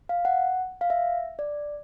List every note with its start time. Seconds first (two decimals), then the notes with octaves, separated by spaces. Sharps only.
0.09 F5
0.25 F#5
0.81 F5
0.90 E5
1.39 D5